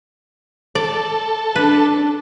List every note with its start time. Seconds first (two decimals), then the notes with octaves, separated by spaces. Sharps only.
0.75 A4 D5
1.56 D4 B4